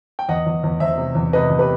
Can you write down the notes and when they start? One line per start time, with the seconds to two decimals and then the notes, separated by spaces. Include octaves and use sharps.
0.19 G5
0.29 E2 D#5 F#5
0.46 E2
0.64 E2
0.80 E2 C5 E5
0.98 C3
1.15 E2
1.33 C3 B4 D#5
1.50 E2
1.59 G4 B4